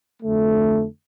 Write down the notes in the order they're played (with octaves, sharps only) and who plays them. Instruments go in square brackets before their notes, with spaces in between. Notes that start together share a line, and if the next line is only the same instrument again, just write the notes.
[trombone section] F2 D3 A3